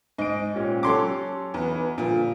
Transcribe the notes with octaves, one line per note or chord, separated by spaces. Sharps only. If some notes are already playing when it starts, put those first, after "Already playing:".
G#2 D#5 D7
A#2 C#4 G4
F#3 C#4 A4 C6 D6
B1 E2 B4
G2 A#2 D3 F3